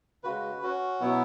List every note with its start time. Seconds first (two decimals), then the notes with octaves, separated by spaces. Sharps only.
0.24 C#3 G#3 F#4 B4
0.62 C#4 F#4
1.01 B2 F#3 B3 E4